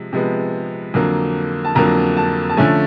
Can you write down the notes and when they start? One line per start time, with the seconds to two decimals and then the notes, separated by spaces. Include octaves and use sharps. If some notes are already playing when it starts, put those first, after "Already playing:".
Already playing: C3 F3 G#3
0.13 C3 F3 G#3 B3
0.94 F2 D3 F#3 A#3
1.65 A5
1.75 F2 D3 F#3 A#3 A#5
2.17 A5
2.50 A5
2.57 D3 F3 A3 C#4 G#5